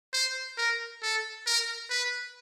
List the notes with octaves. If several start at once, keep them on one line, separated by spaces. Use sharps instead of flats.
C5
A#4
A4
A#4
B4